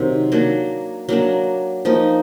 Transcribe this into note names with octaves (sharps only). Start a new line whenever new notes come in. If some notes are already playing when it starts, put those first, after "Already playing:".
Already playing: C3 D#3 F#3
F#3 A#3 D4
F#3 A#3 D4
F3 A#3 D#4